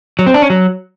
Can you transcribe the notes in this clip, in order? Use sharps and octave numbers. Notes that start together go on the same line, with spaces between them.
F#3
C4
D4
C#4
F#3